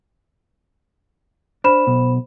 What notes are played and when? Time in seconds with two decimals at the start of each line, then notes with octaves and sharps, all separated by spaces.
1.64 D4 C5 B5 E7
1.87 B1 B2